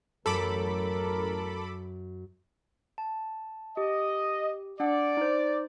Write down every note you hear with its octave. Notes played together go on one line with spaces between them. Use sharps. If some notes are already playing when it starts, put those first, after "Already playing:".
A1 F#2 A4 A#4 B5 D6
A5
G4 D#5
D4 D5 F#5
D#4 C5